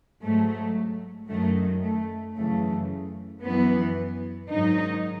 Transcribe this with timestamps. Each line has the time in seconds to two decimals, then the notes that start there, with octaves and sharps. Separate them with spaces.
0.22 G#2 F#3 A3
1.29 F#2 D#3 F#3 A3
1.82 A3
2.36 F#2 C#3 E3 A3
3.43 F#2 E3 B3
4.49 G#2 D#3 F#3 D#4